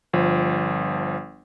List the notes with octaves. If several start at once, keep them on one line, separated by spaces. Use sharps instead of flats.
G1 F3